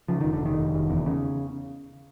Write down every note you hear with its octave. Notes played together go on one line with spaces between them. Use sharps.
C#3 F3
F1 D#3
D3
F1 D#3
F1
F1
E2
C#3